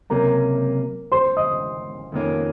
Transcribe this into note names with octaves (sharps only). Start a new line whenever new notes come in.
C#2 C3 F#3 A#3 C#4 A#4 A#5
C5 C6
D#5 D#6
F2 D#3 A#3 C#4